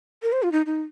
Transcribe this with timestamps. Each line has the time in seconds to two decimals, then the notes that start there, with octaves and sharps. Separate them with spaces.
0.22 A#4
0.32 C5
0.43 F4
0.52 D#4
0.66 D#4